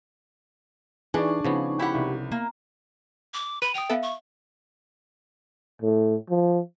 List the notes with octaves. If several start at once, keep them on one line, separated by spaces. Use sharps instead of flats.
E3 D4 D#4 G#4 D5 C#6
C#3 F3 B3
E4 G4 F#5
C2
A#3 A#5
D6
B4 B5 D#7
G5 D#6 F7
B3 A4 E5 F5
C#6
A2
F3